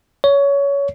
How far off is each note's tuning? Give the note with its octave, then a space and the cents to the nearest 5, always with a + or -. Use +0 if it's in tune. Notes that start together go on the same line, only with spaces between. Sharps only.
C#5 +20